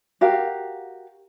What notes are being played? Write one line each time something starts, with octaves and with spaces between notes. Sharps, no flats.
F#4 G4 A#4 F5